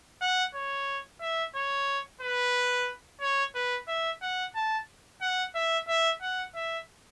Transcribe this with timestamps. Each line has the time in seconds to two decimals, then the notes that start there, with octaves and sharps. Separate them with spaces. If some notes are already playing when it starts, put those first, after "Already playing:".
0.21 F#5
0.54 C#5
1.21 E5
1.55 C#5
2.21 B4
3.21 C#5
3.55 B4
3.88 E5
4.22 F#5
4.55 A5
5.21 F#5
5.55 E5
5.88 E5
6.22 F#5
6.55 E5